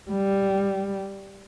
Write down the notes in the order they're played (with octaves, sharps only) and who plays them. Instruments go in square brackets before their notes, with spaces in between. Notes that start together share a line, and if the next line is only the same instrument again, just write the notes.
[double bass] G3